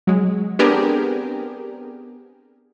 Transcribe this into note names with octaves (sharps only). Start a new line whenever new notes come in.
F#3 G#3
B3 C4 D4 G4 G#4 A#4